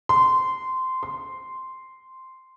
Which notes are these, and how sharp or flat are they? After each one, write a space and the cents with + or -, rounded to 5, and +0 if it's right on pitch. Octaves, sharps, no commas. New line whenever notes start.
C6 -15
C6 -5